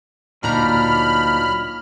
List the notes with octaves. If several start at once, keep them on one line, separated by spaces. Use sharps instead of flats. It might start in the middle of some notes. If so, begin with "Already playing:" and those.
D2 A#2 F#3 D4 D#4 A#5 B5 F6